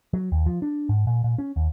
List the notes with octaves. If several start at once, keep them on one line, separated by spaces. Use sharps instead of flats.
F#3
D#2
F3
D4
G#2
A#2
A#2
C#4
D#2